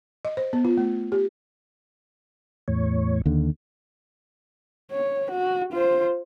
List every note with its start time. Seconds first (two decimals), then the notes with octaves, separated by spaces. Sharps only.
0.25 D#5
0.37 C5
0.53 B3
0.65 F4
0.77 A3
1.12 G4
2.68 E2 A2 C#5
3.26 D#2 D3
4.91 C#5
5.31 F#4
5.73 F4 C5